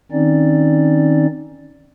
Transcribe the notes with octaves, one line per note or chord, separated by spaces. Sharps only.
D#3 C4 C#4 D#4 D5